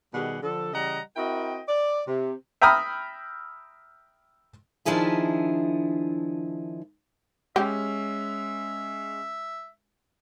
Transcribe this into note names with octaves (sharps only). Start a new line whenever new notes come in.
B2 D#3 G3 G4 G#4 F#5
D3 F3 A4
C#3 E3 G3 D#5 F#5 A#5
C4 E4 F#4 A#4 D#5 G5
D5
C3
E5 G5 A#5 B5 D#6 F6
D#3 F3 D4 E4 G#4 E5
G#3 C#4 G4 E5